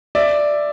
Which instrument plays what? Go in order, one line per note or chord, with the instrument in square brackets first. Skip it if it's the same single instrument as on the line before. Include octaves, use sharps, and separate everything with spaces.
[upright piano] D5 E5